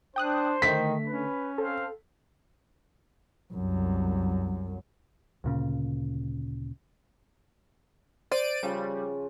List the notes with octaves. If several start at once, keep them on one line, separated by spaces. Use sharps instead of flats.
D4 C5 G5 D#6 F#6
D3 D#3 A3 B6
C#4 B4
C4 A4 C5 F5
C2 F#2
D2 A#2 C#3
C5 D5 D7 D#7
C#3 F3 G3